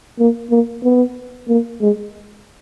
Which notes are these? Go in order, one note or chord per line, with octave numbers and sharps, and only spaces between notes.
A#3
A#3
B3
A#3
G#3